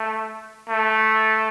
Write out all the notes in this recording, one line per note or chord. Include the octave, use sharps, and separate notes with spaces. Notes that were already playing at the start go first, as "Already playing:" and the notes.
Already playing: A3
A3